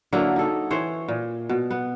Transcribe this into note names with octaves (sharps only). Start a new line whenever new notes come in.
D3 F#3 A#3 E4
D#4 A4
E3 C5 C#5
A#2
B2
B3